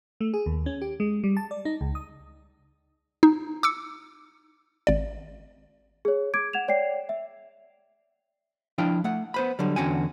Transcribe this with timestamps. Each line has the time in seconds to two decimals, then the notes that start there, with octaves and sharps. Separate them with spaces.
0.21 A3
0.34 G#4
0.46 D#2
0.66 C#4
0.82 G4
1.00 G#3
1.24 G3
1.37 A5
1.51 D5
1.65 D#4
1.81 C#2
1.95 D#6
3.23 D#4
3.63 D6 E6 C#7
4.87 G#1 D5
6.05 G#4 C#5
6.34 D6 G#6 D7
6.53 F#5 G#6 E7 F7
6.68 C#5 D5 G5 C7
7.09 E5
8.78 F3 D4 E4 F5 G5
9.04 A3 F#5
9.34 B3 C5 B5
9.59 D3 F#3 G3
9.76 E2 D3 C#4 F#4 G5 G#5